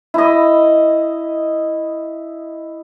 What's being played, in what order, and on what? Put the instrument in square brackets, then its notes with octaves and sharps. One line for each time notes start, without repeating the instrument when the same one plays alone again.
[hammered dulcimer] E4 D#5